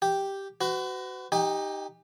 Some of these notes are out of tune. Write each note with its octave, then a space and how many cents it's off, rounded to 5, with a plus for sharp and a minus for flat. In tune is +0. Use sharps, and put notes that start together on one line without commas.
G4 +0 G5 +0
F#4 +15 B4 +40
D#4 +0 G4 +0 G#5 -45